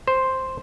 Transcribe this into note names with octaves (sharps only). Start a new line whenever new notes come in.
C5